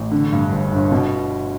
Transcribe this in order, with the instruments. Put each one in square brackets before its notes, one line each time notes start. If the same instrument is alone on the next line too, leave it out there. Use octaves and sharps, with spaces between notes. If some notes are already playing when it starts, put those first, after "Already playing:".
Already playing: [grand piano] A1
D3
G2
G1
G1
B2